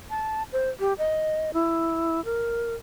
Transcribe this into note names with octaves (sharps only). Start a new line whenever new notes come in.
A5
C5
G4
D#5
E4
A#4